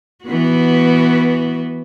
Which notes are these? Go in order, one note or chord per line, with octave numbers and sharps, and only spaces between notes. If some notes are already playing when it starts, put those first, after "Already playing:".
E3 B3 F#4